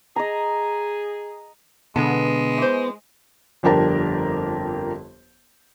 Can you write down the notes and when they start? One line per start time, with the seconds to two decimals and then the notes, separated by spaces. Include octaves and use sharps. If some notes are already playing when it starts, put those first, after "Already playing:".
0.16 G#4 D#5 A#5
1.96 B2 D3 G#3 B3 D4 A4
2.58 E3 C5
3.63 G1 F2 D4 G4 A#4 A5